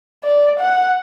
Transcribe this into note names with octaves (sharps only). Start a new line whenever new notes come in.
D5
F#5